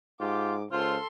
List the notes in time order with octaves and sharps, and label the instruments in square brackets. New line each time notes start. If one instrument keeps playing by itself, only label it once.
[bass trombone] G#2 [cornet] F4 [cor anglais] G4 [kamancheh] D6
[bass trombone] C#2 [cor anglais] F4 [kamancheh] A4 C6 [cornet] C5